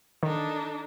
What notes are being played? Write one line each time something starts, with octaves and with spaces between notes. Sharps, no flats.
D#3 D4 D#4 A4